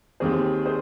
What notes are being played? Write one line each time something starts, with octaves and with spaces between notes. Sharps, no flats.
D#2 D#3 C4 G#4 C5
G#4 C5